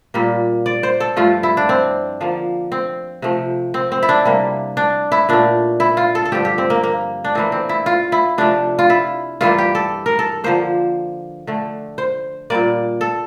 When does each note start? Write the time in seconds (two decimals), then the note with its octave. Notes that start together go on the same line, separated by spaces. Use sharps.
0.14 A#2 G3 A#3
0.66 D5
0.83 C5
1.00 A4
1.17 G2 F3 A3 F4
1.43 E4
1.57 D4
1.69 C4
2.21 D3 F3 A#3
2.72 C4
3.22 C3 F3 A3
3.74 C4
3.92 C4
4.03 E4
4.09 D4
4.25 C3 G3 A#3
4.77 D4
5.12 E4
5.29 A#2 A3 D4
5.80 E4
5.97 F4
6.15 A4
6.25 A4
6.32 G2 D3 F3 G4
6.45 G4
6.58 C4
6.70 A#3
6.84 A#3
7.25 D4
7.35 A2 E3 A#3 C4
7.52 C4
7.69 E4
7.86 F4
8.12 E4
8.38 C3 F3 A3 D4
8.79 F4
8.90 E4
9.41 G2 E3 G3 A#3 F4
9.58 G4
9.75 A4
10.06 A#4
10.19 A4
10.44 D3 F3 A#3 C5
11.47 D3 A3
11.98 C5
12.50 A#2 G3 A#3 D5
13.01 A4